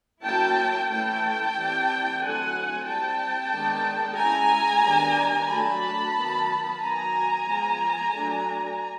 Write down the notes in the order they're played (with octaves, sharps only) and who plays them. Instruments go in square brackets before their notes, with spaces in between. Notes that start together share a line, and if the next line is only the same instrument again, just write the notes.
[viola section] F#3 A#3 C#4 E4 G5 A5
E3 A3 C#4 E4 G5 A5
E3 G3 C4 E4
D3 F#3 A3 C4 E4 F#5 G#5
G3 C4 E4 G5 A5
D#3 G#3 B3 D4
G#3 C#4 E4 G#5 A#5
D#3 G3 B3 D4
F#3 A3 D4 A5 B5
D#3 F#3 B3
D#3 F#3 B3 G#5 A#5
F3 G#3 B3
F#3 A3 D4